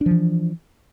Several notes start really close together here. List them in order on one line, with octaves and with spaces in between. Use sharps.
D4 F3 E3